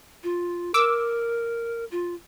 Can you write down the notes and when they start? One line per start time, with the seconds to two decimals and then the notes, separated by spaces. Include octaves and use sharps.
0.24 F4
0.74 A#4 D6 E6
1.91 F4